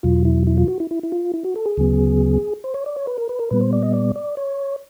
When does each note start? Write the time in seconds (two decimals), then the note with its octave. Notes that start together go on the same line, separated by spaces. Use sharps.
0.03 E2 B2 F#3 F4
0.25 E4
0.47 E4
0.58 F4
0.68 F#4
0.80 E4
0.91 E4
1.03 E4
1.12 F4
1.34 E4
1.44 F#4
1.56 A4
1.66 G#4
1.77 D2 C#3 F#3 B3
2.64 C5
2.74 C#5
2.86 D5
2.96 C#5
3.07 B4
3.18 A#4
3.29 B4
3.39 A#4
3.51 A#2 G3 B3 B4
3.61 C5
3.73 D5
3.82 D#5
3.93 D5
4.16 D5
4.37 C#5